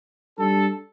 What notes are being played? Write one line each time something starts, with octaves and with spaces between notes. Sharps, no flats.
G3 D4 A4